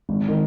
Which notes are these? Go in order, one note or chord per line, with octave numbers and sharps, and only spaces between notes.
G#1
D#3